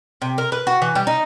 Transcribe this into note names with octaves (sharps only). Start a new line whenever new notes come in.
C3
A#4
B4
F#4
E3
G3
D#4